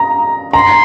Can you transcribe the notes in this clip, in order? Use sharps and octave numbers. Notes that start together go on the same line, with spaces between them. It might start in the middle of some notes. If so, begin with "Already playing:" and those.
Already playing: A#5
A#5 C6